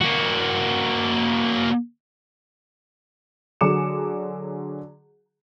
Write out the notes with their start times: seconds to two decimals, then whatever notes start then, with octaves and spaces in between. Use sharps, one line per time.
0.01 A#3 F#4
3.61 D3 F#3 G#4 D6 C#7 E7